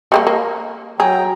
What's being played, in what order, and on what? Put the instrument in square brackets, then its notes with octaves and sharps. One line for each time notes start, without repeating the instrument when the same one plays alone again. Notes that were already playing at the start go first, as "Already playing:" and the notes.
[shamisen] G3 G#3 A#3
A#3
[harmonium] F#3 G5 A#5 [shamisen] G#4